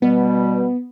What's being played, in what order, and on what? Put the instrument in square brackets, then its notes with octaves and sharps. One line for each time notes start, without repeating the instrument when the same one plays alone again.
[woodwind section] B2 G3 [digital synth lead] B3